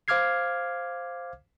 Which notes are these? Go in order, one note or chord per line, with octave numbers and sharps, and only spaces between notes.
C5 F5 D6 F6 G#6 C7